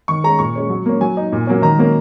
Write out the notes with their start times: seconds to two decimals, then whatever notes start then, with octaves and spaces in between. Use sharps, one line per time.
0.08 D#3 C#6
0.24 G#3 C#4 A#5
0.39 A#2 C#6
0.55 G#3 C#4
0.70 F#3
0.86 A#3 C#4
1.01 F#3 G#5
1.17 D#4
1.32 A#2
1.47 F#3 A#3 C#4
1.62 D#3 A#5
1.78 F#3 A#3 C#4